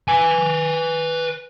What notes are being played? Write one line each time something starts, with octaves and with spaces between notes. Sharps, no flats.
B4 G#5